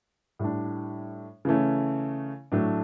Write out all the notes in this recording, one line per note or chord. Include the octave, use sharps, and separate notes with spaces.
A2 G3 D4
C#3 E3 A3 C#4
A2 F#3 A3 D4